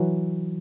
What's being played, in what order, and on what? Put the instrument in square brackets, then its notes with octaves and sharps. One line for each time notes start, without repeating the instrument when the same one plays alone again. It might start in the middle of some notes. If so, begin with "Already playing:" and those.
Already playing: [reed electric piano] E3 F#3